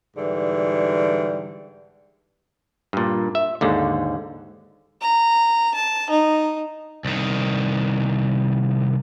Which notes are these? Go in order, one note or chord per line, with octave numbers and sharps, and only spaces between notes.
G#2 D3 E3 G3
G2 A#2
E5
D#2 G#2 D3
A#5
A5
D#4
C2 D#3